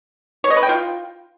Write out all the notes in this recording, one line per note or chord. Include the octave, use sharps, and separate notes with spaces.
C#5
D#5
B4
G5
F4